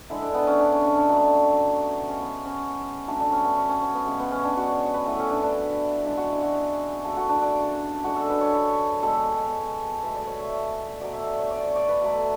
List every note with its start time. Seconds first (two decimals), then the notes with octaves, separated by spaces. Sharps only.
0.10 D3 G#3 E4
0.22 D4
0.34 B3
0.47 C#4
0.59 D4
0.72 C#4
0.85 C#4
0.97 D4
1.09 B2 F#3 A3
2.08 C#3 G#3 C#4
2.21 B3
2.45 C#4
3.07 D3 F#3 A3 D4
3.20 D4
3.32 C#4
3.44 B3
3.57 C#4
3.69 C#4
3.81 C#4
3.95 B3
4.06 C#3 G#3
4.20 B3
4.32 C#4
4.44 D4
4.57 F#4
4.68 C#5
4.94 B4
5.05 A2 E3 A3 A4
5.19 C#4
5.30 D4
5.43 D4
6.05 C#3 E3 G#3 D4
6.17 F#4
6.30 E4
6.42 F#4
6.55 G#4
7.04 C#3 F#3 A3 A4
7.17 F#4
7.29 D4
7.42 D4
8.03 D3 G#3 F#4
8.16 A4
8.29 B4
8.41 C#5
8.53 B4
9.02 B2 G#3 A4
10.01 B2 A3 B4
10.15 D5
10.27 C#5
10.39 E5
10.52 D5
11.01 B2 F#3 A3 D5
11.13 E5
11.26 D5
11.39 C#5
11.51 D5
11.63 C#5
11.76 D5
11.88 B4
12.01 B2 F#3 A3